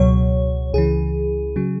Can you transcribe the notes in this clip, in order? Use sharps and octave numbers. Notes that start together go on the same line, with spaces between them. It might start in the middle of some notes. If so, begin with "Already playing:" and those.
Already playing: C#2 B2 F#3 C#5
C#2 C#3 E3 G#4
C#3 F#3